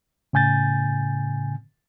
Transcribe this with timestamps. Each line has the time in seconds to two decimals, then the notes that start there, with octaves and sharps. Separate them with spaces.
0.33 A2 C#3 G#5 G6 A6